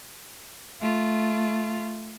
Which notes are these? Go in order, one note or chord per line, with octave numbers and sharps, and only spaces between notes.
A3 F4